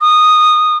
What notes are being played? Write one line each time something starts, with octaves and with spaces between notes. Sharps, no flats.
D#6